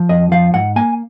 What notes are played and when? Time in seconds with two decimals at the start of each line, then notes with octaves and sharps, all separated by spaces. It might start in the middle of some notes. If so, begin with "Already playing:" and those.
Already playing: F3
0.09 F2 D#5
0.32 F3 F5
0.54 G#2 F#5
0.76 A#3 G#5